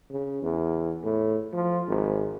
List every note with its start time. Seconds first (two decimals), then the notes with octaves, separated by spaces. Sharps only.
0.10 C#3
0.43 E2
1.04 A2
1.53 F3
1.88 G#1